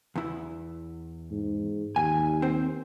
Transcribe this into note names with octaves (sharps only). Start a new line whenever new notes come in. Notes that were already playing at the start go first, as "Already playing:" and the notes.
E2 E4
G#2
D#2 G#5
C4 C5